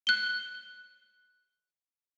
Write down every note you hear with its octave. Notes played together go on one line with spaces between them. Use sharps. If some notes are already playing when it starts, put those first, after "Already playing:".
F#6 G7